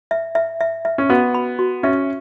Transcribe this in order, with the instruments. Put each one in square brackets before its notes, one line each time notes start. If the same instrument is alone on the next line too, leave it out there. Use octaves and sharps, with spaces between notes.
[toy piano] E5
E5
E5
E5
[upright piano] C#4
[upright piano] B3 [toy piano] F#4
[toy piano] B5
F#4
[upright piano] C#4 [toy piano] E5